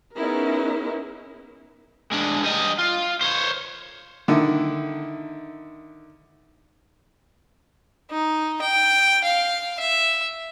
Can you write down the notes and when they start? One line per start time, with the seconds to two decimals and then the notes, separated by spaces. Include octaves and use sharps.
0.16 B3 C#4 D#4 E4 G#4 A#4
2.12 G#3 D4
2.43 G3 D#5
2.79 F4
3.21 C5 C#5
4.28 D3 D#3 E4
8.11 D#4
8.62 G5
9.24 F5
9.80 E5